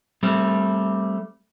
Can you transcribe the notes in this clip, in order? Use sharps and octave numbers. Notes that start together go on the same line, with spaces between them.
G3 A3 C4